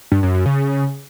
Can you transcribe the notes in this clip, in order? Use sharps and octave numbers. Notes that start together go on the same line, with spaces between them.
G2
F#2
F#2
C#3